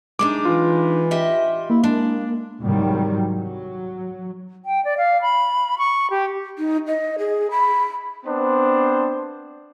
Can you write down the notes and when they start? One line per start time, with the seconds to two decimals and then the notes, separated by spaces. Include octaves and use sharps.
0.19 G#3 D4 D#4 D6
0.45 E3 F4
1.11 G4 D#5 E5
1.70 A#3 E4
1.83 G#3 D4
2.61 C2 G#2 C3 D#3 F#3 G3
3.39 F#3
4.65 G5
4.85 D5
4.98 F5
5.22 B5
5.78 C#6
6.10 G4
6.58 D#4
6.87 D#5
7.19 G#4
7.51 B5
8.25 B3 C4 D4 C5